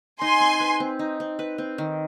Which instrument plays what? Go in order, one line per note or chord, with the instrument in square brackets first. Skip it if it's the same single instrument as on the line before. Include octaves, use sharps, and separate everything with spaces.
[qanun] D#4 [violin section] G#5 C6
[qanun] C4
B4
C4
D#4
C4
B4
C4
D#3